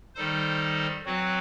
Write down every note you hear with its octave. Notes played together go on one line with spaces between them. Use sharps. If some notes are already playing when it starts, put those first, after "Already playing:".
D#3 G3 D#4 A4 C5
F#3 C4 F#4 B4